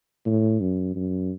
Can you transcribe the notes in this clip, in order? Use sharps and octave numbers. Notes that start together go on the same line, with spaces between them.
A2
F#2
F#2